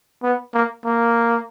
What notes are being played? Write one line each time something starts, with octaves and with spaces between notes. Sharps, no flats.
B3
A#3
A#3